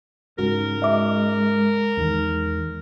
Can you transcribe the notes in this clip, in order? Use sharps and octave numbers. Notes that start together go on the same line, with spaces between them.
G#2 C#3 G#3 F#4 A#4
D#5 E5 D6
E2 D#3 G#3